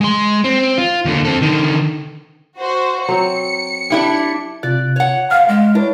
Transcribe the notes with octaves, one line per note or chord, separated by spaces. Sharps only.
G#3 C6
C4
F4
D#2 D3
C4 A4
D3 D#3
F#4 C5
F#3 C4 C#7
D4 E4 G4
C3 F4 D5 F#6
C#5 F#5
F#2 F5 F6
G#3
D4 E4 B4 C#5